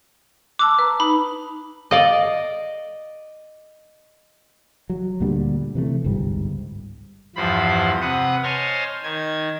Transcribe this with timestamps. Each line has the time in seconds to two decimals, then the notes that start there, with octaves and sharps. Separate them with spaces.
0.59 A5 D6 E6 F#6
0.79 B4 A#5
1.00 D#4 B5
1.91 A4 D5 D#5 F5
4.90 F#3
5.20 D2 A#2 D3 G3
5.75 C3 E3 F3 A3
6.04 G1 C#2 G#2 G3
7.36 E2 G2 F3 C5 B5
8.01 C3 B4 F#5 D#6
8.43 C5 C#5 D#5 G#5 A5 F6
9.03 D#3 G#6